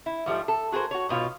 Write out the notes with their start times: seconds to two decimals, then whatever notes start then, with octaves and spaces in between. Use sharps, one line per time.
0.06 E4
0.26 G#2 F3 G3 A3
0.48 A4
0.72 F#4 G#4 A#4 C5
0.91 F#4 C#5
1.09 G#2 B2 F4 C#5